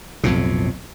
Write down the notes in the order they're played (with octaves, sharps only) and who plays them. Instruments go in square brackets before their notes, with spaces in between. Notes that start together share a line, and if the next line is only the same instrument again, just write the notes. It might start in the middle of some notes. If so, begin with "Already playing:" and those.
[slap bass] B1 F2 A2 C3